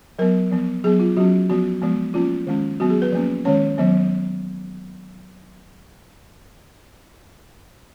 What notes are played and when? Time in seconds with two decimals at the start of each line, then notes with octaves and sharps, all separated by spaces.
0.19 F#3 B3 A#4
0.51 F3 B3
0.84 F#3 G#4
0.87 B3
1.00 F4
1.17 F#3 C#4 F#4
1.49 F3 B3 F#4
1.82 F3 G#3 B3
2.14 F3 A#3 C#4 F4
2.47 D#3 G#3 C#4
2.80 F#3 B3 F#4
2.90 G#4
3.02 B4
3.12 F3 A#3 C#4
3.45 D#3 G#3 C#4 C#5
3.78 D#3 F#3 B3